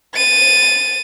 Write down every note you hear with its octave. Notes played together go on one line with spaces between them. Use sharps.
A6 D#7